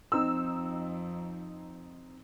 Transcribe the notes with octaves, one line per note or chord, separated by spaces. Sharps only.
F2 C4 D#4 E6